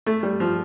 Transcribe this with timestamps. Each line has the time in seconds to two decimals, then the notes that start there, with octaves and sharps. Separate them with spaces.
0.06 A3
0.23 G3
0.40 F3